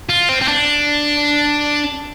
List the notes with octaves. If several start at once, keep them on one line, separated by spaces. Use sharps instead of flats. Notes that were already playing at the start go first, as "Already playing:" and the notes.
F4
C4
C4
D4